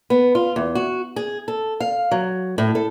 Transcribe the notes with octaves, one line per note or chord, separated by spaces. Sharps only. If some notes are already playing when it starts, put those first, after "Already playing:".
B3
F4
E2
F#4
G#4
A4
F5
F#3
A2
A4